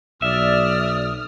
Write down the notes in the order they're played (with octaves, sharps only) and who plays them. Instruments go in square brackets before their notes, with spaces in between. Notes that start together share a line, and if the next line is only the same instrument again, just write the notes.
[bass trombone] B1 [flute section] D5 [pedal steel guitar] E5 [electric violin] D#6 F6